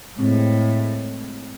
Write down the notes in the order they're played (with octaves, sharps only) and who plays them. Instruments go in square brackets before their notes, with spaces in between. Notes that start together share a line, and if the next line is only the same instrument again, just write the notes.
[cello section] A2 [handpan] G#3 C4